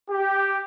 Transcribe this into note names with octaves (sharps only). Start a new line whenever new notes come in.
G4